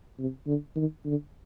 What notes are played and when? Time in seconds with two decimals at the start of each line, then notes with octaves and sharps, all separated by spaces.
0.19 C3
0.47 D3
0.76 D#3
1.06 D3